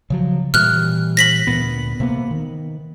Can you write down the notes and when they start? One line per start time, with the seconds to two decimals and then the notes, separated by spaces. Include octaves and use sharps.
0.10 C#3 F3 F#3
0.54 A#2 E3 G3 F6 F#6
1.17 A#6 B6 F#7
1.47 D2 A#2 B3
2.00 C3 A#3 B3
2.31 D#3